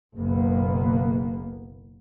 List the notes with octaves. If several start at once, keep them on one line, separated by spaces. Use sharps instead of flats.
F#1 B1 A#3 B3